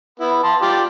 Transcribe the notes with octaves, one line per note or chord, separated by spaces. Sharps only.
B3 E4
A5 C6
F4 G4 D5